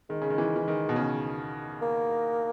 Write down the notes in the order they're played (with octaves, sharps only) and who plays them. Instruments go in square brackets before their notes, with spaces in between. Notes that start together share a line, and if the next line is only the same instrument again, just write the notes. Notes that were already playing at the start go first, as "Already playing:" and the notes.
[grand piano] D#3 [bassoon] G#3
[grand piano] C#3
D#3
E3
E3
D#3
B2
C#3
[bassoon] A#3